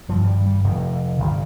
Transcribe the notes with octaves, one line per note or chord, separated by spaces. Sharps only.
G#1 G2 F3
G3
G3
F1 F2 C3
G1 C3